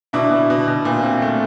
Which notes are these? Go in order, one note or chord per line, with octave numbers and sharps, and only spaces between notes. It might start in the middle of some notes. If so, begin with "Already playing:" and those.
B2 D4 E4
B2
B2
B2
A#2
C4
A3